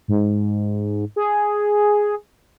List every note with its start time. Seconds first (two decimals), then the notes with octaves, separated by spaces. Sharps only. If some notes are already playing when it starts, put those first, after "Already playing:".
0.08 G#2
1.16 G#4